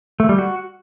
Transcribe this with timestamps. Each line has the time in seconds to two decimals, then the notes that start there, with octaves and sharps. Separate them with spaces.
0.20 A3
0.29 G3
0.39 F#4